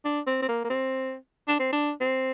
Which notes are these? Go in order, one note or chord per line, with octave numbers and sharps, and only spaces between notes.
D4
C4
C4
A#3
A#3
C4
D4
C4
D4
C4